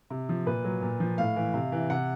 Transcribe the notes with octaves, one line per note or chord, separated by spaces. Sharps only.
C3
F3
A#2 B4
F#3
A#2
F3
A2 F5
E3
C3
E3
C3 F#5